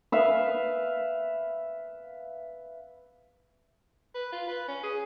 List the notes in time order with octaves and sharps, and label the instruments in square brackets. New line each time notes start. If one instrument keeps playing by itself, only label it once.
[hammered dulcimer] B4 E5 F5
[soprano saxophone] B4
F4
B4
C#4
G#4